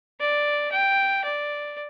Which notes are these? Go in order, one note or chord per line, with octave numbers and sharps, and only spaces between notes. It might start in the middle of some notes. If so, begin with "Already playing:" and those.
D5
G5
D5